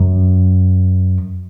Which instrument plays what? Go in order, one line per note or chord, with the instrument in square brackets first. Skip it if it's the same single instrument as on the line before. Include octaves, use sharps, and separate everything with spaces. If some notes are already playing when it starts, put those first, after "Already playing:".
Already playing: [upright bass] F#2